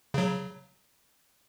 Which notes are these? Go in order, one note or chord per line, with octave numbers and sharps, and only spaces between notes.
C#3 F#3